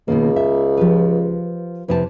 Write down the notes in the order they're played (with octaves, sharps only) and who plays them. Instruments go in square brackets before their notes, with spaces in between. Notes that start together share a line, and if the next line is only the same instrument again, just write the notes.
[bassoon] C#2 [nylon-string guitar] B2 D#3 A#3
[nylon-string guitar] E5
F3 G4 B4
[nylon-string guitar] F2 C3 A5 [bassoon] E3